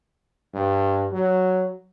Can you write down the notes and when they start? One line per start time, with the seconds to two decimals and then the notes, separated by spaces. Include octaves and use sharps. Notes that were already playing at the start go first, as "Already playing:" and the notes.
0.54 G2
1.12 F#3